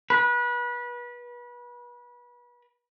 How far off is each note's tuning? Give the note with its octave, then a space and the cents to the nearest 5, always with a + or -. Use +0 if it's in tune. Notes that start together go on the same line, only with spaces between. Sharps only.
B4 -30